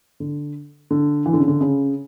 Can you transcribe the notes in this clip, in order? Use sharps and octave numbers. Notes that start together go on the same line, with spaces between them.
D3
D3
E3
D3
C#3
D3
C#3